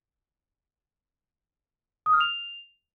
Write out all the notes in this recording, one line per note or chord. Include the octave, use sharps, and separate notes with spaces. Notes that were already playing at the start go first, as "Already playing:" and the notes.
D#6
F6
F7